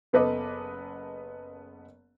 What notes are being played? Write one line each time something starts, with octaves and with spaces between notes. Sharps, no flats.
F#1 B3 A4 B4 D#5 D6